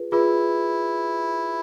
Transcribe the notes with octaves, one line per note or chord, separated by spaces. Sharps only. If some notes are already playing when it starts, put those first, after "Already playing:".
Already playing: F4 G#4 B4
E4 F4 G#4 B4